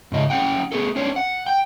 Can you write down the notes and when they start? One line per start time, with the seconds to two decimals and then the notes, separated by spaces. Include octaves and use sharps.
0.12 G#2 C#3 D#5
0.30 C#4 D4 E4 F#5 G5
0.72 B3 G#4 A4
0.96 C#4 D4 C5 C#5
1.16 F#5
1.47 G5